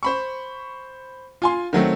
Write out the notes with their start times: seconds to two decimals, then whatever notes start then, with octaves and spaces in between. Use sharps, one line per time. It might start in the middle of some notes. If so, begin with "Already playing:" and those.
0.03 C5 B5 C#6
1.42 F4 G#5 C6
1.73 D#3 F#3 A3 C4